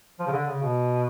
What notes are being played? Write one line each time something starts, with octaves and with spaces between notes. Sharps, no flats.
F3
C#3
D3
C#3
B2